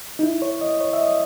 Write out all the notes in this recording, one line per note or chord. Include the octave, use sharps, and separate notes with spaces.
D#4
E4
C#5
D#5
C#5
E5
D#5